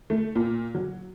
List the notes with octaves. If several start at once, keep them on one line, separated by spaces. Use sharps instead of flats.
A3
A#2
F#3